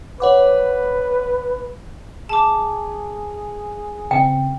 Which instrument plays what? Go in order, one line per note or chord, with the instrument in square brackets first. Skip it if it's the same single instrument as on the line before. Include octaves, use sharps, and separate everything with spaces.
[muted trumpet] B4 [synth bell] C#5 F#5 D6
[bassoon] G#4 [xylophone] A5 D6
[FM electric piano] C#3 C4 [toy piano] G5